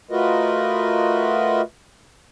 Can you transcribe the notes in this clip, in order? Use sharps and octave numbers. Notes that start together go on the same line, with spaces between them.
A3 F4 F#4 A#4 B4 D#5